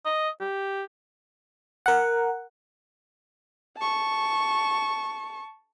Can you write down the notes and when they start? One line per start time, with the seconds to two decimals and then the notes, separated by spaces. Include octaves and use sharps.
0.05 D#5
0.41 G4
1.86 A#4 F#5
3.77 A5 C#6